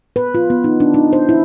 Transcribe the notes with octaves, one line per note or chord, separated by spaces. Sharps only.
B4
F4
B3
D#4
D4
D#4
C5
E4